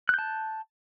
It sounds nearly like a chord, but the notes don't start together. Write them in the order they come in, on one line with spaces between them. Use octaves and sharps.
F#6 G6 A5